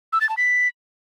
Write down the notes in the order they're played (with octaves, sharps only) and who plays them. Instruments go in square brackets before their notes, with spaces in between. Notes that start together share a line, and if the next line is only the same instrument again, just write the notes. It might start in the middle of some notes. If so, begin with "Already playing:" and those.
[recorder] E6
A6
A5
B6